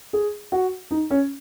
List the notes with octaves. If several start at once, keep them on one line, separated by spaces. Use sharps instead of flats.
G#4
F#4
D#4
C#4